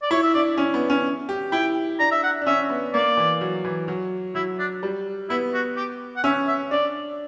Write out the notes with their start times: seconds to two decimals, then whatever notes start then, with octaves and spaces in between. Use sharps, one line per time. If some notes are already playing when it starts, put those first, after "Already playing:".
0.02 D5
0.11 E4 C#5
0.23 E5
0.34 D4 D5
0.58 C#4
0.74 B3
0.90 C#4
1.29 G4
1.52 E4 G5
1.99 D4 A#5
2.11 E5
2.23 F#5
2.42 D4
2.46 C#4 E5
2.70 B3
2.94 A#3 D5
3.17 E3
3.41 F#3
3.64 E3
3.88 F#3
4.35 F#3 E4
4.59 D4
4.83 G3
5.29 B3 E4
5.54 F#4
5.77 G4
6.16 F#5
6.24 C#4 E5
6.48 E5
6.71 D4 D5